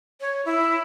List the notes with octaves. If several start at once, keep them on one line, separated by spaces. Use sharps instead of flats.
C#5
E4